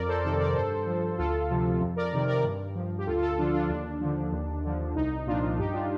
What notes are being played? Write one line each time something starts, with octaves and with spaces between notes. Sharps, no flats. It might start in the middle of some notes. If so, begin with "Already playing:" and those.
Already playing: F2 A#4 D5
A4 C5
C3 D#3 A4 C5
A#4 D5
G2 A4 C5
F3
D2 F4 A4
C3 F3
F2
A#4 D5
C3 D#3
A#4 D5
G2
F3
G4
D2 F4 A4
F4 A4
D3 F3 D4 F4
D4 F4
D#2 D4
D3 F3
D#2
D3 F3
C2 D#4
A#2 F3 D4 F4
G2 D#4 G4
D4 F4